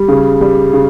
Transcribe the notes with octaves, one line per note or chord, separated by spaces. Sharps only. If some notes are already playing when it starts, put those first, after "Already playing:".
Already playing: G3
C#3
G3
C#3